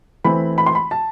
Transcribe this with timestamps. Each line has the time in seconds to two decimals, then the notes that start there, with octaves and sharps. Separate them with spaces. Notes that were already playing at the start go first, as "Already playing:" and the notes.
0.25 E3 A3 C4 E4 B5
0.58 B5
0.66 C6
0.75 B5
0.91 A5